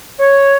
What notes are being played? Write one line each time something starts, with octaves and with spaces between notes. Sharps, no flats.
C#5